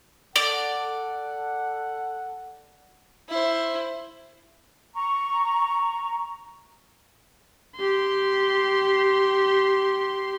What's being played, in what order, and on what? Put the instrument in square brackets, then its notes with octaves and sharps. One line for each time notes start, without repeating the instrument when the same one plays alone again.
[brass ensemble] A4 F#5 [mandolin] D5
[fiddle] E4 C5
[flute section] A#5 C#6
[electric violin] G4 C6